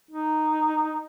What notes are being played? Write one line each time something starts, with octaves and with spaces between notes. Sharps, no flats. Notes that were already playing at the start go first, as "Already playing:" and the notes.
D#4